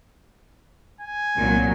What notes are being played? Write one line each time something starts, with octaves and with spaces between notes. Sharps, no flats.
G#5
C2 A#2 F#3